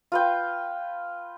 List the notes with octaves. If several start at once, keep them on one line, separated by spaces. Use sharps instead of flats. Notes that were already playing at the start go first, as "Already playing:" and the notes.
F4 B4 G5